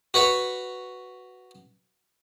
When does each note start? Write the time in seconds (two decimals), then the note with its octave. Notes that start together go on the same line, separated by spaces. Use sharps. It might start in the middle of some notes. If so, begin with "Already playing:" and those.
0.14 F#4 B4 C#5